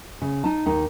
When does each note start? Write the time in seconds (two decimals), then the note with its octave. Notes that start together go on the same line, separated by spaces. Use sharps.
0.22 C#3
0.44 D#4 A5
0.66 D#2 D#4